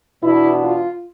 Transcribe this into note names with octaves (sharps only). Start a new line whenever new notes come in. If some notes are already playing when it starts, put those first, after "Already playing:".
E2 B2 B3 D4 E4
F4